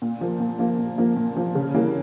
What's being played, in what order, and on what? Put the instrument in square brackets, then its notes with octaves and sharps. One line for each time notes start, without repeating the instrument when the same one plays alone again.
[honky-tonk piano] A#2
F3 A#3
A#2
F3 A#3
A#2
F3 A#3
A#2
F3 A#3
C#3
E3 G3 A#3